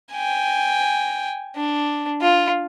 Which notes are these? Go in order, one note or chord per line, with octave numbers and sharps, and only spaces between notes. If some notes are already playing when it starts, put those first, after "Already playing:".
G5 G#5
D4
F4